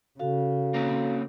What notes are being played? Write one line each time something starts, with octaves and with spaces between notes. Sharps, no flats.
C#3 F#4 A4 F5
A#3 C4 C#4